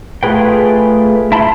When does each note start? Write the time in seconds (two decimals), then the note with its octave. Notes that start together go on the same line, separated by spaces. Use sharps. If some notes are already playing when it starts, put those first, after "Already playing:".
0.23 A3 F4 G#4 B4 G5
1.32 E4 A5 B5 C6